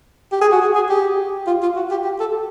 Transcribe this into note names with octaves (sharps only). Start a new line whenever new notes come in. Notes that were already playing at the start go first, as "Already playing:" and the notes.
G4
G#4
F#4
G#4
G#4
G4
F4
F4
F#4
G4
G4
A4